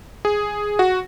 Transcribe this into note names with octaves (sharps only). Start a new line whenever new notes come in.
G#4
F#4